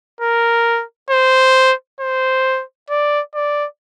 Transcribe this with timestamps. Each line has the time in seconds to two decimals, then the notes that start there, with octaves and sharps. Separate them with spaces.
0.21 A#4
1.10 C5
2.00 C5
2.90 D5
3.35 D5